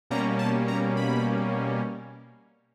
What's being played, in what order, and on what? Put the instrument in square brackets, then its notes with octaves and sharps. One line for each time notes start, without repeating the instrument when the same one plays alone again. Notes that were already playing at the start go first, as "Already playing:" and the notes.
[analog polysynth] B2 G3 A#3 C#4 A#5
A5
A#5
B5